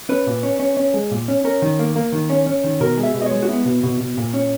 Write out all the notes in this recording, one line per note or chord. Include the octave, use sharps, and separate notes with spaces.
C#4 B4
A#2
C#4
C#4
C#4
G#3
A#2
C#4
C#4 A#4
D#3
A#3
A#3
D#3
C#4
C#4
D#3
B2 A#4
G#3
E5
B2
D#5
C#5
G#3
F#4
B3 E4
B2
B2
B2
A#2
C#4